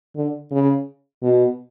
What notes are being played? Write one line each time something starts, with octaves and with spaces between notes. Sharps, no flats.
D3
C#3
B2